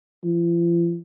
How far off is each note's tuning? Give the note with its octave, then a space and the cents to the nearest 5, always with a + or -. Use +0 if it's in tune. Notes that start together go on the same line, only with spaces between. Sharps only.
F3 -45